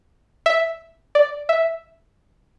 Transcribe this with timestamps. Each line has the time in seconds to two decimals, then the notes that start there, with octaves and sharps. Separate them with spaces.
0.46 E5
1.15 D5
1.49 E5